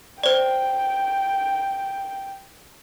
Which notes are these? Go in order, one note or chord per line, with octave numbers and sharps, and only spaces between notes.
C5 D5 G5